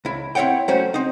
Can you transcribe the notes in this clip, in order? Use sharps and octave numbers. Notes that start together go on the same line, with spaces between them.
C#2 E4
C4 E4 F#4 C#5 F#5 G5
F#3 A3 C#4 F#4 C5 C#5
C4 D#4